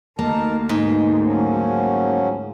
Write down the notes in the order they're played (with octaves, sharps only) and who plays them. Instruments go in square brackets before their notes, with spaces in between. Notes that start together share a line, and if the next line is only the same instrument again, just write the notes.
[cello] D2 [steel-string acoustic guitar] A#3 [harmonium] D#4 A#4 A5
[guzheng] G#2 [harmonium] B2
[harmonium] F3 F#3 C#4